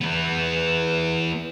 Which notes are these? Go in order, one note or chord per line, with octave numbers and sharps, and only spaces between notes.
E3 B3